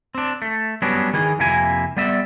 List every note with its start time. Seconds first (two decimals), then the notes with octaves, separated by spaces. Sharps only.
0.15 C4 D4
0.42 A3
0.82 F#3 G3 B3 C#4 D4 F#4
1.13 D#3 E3 G#4
1.39 F2 C3 A#3 E4 G#5
1.97 G3 B3 D5 E5